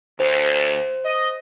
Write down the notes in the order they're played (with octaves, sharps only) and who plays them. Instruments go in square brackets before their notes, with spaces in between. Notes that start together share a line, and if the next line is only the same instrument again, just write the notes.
[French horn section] D2 [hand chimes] C5
[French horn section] D#5